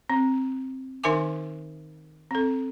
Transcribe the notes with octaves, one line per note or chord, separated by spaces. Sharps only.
C4
D#3 D#4 A#4 E5 G#5 D6
C4 A4